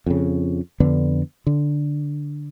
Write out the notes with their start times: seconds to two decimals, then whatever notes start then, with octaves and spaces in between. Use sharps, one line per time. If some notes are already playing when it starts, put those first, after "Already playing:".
0.06 F2 C#3
0.80 F2 D3 B3 D4
1.47 D3